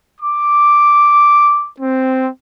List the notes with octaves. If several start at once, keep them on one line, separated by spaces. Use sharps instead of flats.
D6
C4